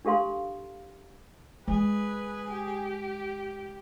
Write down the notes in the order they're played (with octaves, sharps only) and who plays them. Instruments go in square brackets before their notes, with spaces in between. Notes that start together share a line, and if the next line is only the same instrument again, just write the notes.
[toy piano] D4 G4 A4 F5 C6
[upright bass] G#3 [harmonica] G#4 [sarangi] B4
[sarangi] G4